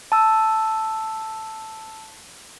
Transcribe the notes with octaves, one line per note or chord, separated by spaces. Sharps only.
A5 E6